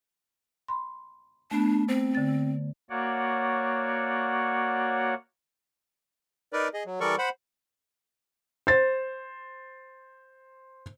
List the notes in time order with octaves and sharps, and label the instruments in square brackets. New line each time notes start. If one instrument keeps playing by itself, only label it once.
[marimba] B5 C6
[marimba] A3 B3 [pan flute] D4
[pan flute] C4 [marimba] C5
[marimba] D3 A6
[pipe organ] A#3 F#4 C#5 D5 F#5
[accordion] D#4 A#4 B4 D5
G#4 D#5
F#3
E3 G3 A4 A#4 D5 C#6
C5 F#5 B5
[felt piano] C5 A6